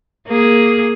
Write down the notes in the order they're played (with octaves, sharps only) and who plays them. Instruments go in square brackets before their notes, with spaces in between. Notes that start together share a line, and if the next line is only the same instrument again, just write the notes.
[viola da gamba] A#3 G#4